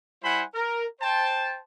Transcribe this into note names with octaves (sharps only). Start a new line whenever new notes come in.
G3 E4 C5 F#5 G#5 B5
A#4
C5 G5 A5